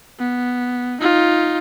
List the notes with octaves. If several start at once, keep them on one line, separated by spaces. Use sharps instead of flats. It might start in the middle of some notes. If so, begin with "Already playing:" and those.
B3
D#4 F4